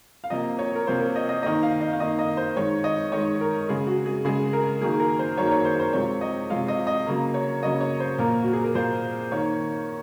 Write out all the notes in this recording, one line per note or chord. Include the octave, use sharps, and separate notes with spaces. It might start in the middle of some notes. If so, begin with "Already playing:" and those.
F5
C3 F3 A#3 D#5
C#5
A#4
C3 F3 A#3 C5
A#4
D#5
D#5
D#3 A#3 D#5
F5
D#5
F5
D#3 A#3 D#5
D#5
C5
D#3 G#3 C#5
D#5
D#3 G#3 C#5
A#4
C#3 G#3 G#4
F#4
G#4
C#3 G#3 G#4
A#4
D#3 F#3 A#3 G#4
A#4
C5
D#3 F#3 A#3 C#5
C#5
C5
C5
C3 F3 G#3 C#5
D#5
C3 F3 G#3 F5
D#5
D#5
C#3 F#3 A#3
C#5
C#3 F#3 A#3 D#5
C#5
C5
A#2 F3 A#3 A#4
F#4
G#4
A#4
A#2 F3 A#3 C5
D#3 A#3 C#5